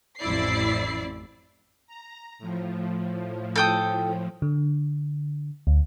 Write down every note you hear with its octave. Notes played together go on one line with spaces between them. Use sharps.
A1 F2 E4 D5 C7
A#5
A2 F3
A4 G5 D#6
D3
D2